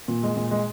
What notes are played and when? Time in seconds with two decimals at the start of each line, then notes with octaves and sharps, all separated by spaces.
0.08 A#2
0.23 G#3
0.37 A#2
0.51 G#3